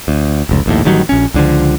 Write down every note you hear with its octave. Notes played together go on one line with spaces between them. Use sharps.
D2
F1 C#2
A#1 D#2 A2
A1 D#3 F#3 G3
A#1 C#4
C#2 D3 F3